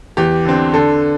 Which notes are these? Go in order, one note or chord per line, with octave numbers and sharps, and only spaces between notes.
E2 G4
D3 C4
D3 A4